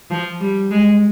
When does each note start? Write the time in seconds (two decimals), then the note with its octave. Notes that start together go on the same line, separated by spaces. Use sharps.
0.10 F3
0.40 G3
0.71 G#3